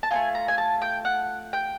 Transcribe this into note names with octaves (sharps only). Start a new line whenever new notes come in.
A5
A3 C4 F4 G#5
A#5
G#5
A5
G5
F#5
G5